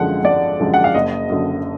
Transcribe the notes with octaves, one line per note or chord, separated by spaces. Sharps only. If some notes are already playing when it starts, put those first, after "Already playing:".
Already playing: G#1 F#2 D3 F3 G#3 F#5
G#1 D5
F#2 D3 F3 G#3
F#5
F5
F#1 D#5
F#2 D3